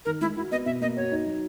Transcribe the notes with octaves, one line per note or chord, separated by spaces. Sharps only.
D#3 A#4
G#3 E4
E4 F#4
B3 D#5
B2 E5
A#3 D#5
F#4 C#5
D#4
F#3